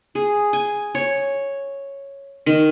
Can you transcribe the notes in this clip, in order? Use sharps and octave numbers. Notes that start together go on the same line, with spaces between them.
G#4
G#5
C#5
D#3